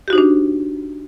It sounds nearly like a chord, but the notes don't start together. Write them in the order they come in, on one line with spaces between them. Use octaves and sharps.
G4 F#4 D#4 C5 D4